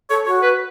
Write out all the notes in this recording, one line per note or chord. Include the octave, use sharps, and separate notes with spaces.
A4 C#5
F#4 C#5
B4